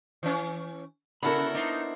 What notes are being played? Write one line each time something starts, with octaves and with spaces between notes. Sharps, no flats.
E3 C#4
C#3 B3 E4 F#4 A4 A#4 B5
D4 D#4 C5